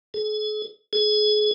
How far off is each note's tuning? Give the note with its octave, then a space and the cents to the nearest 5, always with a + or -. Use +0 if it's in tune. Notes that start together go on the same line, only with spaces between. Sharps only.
G#4 +45
G#4 +30